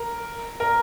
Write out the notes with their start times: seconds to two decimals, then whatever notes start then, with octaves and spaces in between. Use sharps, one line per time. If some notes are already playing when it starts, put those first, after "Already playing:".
Already playing: A#4
0.60 A#4